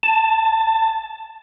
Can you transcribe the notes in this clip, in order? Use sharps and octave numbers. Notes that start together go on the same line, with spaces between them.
A5